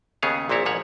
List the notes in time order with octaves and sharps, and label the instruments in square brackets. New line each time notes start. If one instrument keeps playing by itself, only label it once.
[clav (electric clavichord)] D#2 C#3 B3 G#4 C#5 F5
A#1 A#2 C4 E4 C#5
G#1 G#2 F3 C#5 F#5